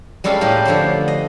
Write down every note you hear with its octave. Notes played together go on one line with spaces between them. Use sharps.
G3 G#3 C#4 A4 F5 B5
A2 A3 A#3 G4 B5
D3 F3 B3 C5
D#5